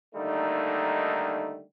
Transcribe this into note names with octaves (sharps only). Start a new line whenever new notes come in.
D3 D#3 G3 A3 A#3 D#4